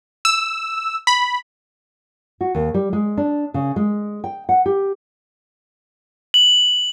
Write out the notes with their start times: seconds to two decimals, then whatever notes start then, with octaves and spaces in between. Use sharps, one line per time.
0.25 E6
1.07 B5
2.41 F#4
2.55 D#2
2.74 G3
2.93 G#3
3.17 D4
3.54 C#3
3.76 G#3
4.24 G5
4.49 F#5
4.66 G4
6.34 F#7